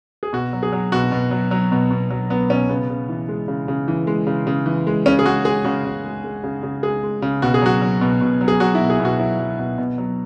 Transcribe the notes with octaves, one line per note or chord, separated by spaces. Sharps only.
G#4
B2 F#4
F#3
G#4
F#3
B2 F#4
B2
F#3
F#3
B2
B2
F#3
F#3 B3
B2 C#4
C#3 B3
C#3
E3
G#3
C#3
C#3
E3
G#3
C#3
C#3
E3
G#3
C#3 C#4
G#4
G#3 F#4
G#3 G#4
C#3 F#4
C#3
G#3
G#3
C#3
C#3
G#3 G#4
G#3
C#3
B2 F#4
G#4
F#3 F#4
F#3
B2
B2
F#3
G#4
F#3 F#4
E4
B2
G#4
B2
F#4
F#3 E4
F#3
B2
B2
F#3